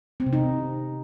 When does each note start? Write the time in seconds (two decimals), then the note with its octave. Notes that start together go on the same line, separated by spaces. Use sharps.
0.20 C4
0.26 C3
0.33 D#4